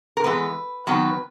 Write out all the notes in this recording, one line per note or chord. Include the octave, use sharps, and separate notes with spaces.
A#4
E3 G#3 B3 B4
D#3 F#3 B3 B4